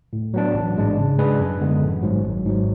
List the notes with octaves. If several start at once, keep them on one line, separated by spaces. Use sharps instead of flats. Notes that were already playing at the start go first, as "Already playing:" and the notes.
A2
F#3 B3 D4
A1
G#2 G#3 D4
C#3
G#3 D4 G#4 B4
F#2
D3 G#3 B3
A1
G#2 F#3
G#1
G#2 F#3